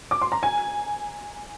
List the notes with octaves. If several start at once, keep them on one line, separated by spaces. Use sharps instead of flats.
D6
C6
A#5
G#5